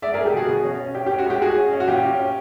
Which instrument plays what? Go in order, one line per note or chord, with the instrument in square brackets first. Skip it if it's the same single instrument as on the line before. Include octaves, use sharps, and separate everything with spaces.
[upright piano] G#3 D5 E5
G#4 A#4
G#3
G4 A4
B2 F#4 G#4
B2
C#4
C#4
C#4 G4
G4
C#4
F#4
G#3 G4
G#3 F#4 G#4
C#4
C#4
F#4
A#2 G4
C#4
C#4